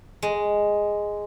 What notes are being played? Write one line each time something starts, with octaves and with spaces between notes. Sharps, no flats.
G#3